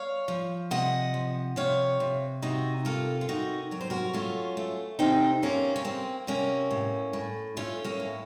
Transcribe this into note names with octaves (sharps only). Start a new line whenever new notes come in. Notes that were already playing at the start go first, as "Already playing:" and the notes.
Already playing: C#5 F5
F3
C3 D#5 F#5
F3
C3 C#5 F5
C3
C3 D#4 F#4
A#3 F4 A4
F4
C3 D#4 F#4
F#3 A#4
C5
F#4 A#4
A3 C#4 F4
A3
C3 C4 D#4
C3 A#3 C#4
C#4
A#3 C4
C3 A#3 C#4
A2
A2
A3 C#4 F4
A#3 C#4
A2